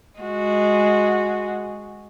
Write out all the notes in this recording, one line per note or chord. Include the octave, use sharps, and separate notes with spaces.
G#3 F#4